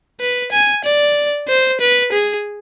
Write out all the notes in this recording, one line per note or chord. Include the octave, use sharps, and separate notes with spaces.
B4
G#5
D5
C5
B4
G#4